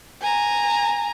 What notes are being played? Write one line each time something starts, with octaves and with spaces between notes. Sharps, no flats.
G#5 A#5